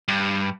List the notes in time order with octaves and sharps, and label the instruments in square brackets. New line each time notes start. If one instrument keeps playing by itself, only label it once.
[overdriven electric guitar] G2